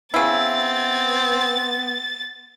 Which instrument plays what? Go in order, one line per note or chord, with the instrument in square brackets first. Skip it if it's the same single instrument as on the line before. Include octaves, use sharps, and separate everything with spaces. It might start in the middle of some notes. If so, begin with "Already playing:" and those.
[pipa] C#3 E4 [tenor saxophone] B3 [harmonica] C4 [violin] A6